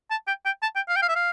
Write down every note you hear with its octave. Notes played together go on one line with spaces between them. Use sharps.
A5
G5
G5
A5
G5
F5
G5
F5
E5
F5